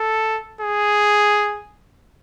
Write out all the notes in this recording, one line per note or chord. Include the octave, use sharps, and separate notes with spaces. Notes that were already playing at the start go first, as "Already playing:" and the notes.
Already playing: A4
G#4